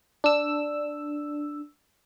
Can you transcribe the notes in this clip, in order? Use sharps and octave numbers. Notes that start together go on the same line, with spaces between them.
D4 E6